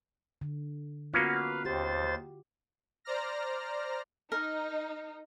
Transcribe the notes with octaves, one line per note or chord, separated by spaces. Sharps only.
D3
A#3 B3 C#4 F4 F#4 B4 F5
D#2 G4 C5 A6
C5 D5 A#5 F6 A#6
D#4 A#4